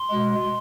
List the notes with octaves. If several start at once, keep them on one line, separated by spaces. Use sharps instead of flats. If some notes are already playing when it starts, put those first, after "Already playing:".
Already playing: C6
B2 G#3